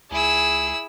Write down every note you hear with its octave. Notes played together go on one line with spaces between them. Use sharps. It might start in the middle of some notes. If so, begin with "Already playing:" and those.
C#2 E4 G#4 E6